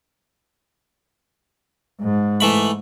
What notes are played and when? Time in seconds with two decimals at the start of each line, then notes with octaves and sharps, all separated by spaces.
2.01 G#2
2.41 E3 A3 B5